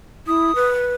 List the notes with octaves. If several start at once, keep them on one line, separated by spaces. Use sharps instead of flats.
E4 D#6
B4